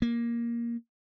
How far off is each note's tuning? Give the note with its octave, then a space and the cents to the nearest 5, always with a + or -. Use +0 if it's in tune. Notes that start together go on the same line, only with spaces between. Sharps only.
A#3 +10